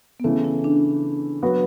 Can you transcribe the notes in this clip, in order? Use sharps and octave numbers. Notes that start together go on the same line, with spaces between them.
B3
C#3 E3 A3 C#4
E4
D4
F#3 B3 F#4 B4